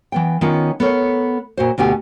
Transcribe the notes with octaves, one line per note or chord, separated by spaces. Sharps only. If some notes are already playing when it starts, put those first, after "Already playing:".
E3 B3 G5
D#3 B3 C#4 F4
B3 A4 A#4 C#5
A#2 F#4 C5
D2 B2 B3 G4 G#5